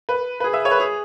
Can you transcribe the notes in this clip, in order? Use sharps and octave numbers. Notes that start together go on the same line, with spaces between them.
B4
B4
G#4
E5
C#5
B4
G#4